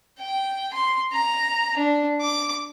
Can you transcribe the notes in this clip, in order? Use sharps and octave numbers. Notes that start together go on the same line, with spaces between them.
G5
C6
A#5
D4
D6